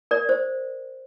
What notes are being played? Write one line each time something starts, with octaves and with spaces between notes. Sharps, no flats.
A#4 D5
C5